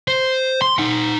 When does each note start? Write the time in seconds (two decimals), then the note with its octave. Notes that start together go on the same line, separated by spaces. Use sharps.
0.08 C5
0.62 C6
0.79 D#4 F#5